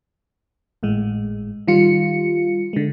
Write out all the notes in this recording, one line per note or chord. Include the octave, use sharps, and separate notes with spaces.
G#1 A2 G#3
D#3 G3 F4 C#7
D3 G#3